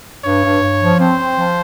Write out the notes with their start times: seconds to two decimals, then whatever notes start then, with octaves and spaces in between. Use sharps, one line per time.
0.25 G2 C#5
0.44 G2
0.63 G2
0.81 F3
1.00 C4 C5
1.18 C4
1.38 F3